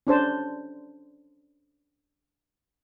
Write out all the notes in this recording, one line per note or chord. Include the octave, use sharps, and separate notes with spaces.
C#4 D4 C5 A5